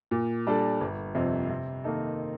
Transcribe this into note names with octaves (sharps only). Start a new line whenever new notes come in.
A#2
G3 D4 A4
G1
F2 C3
C3
D#3 A#3 D#4 A4